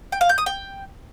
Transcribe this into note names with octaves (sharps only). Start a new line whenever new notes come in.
G5
F5
G6
D#6
G5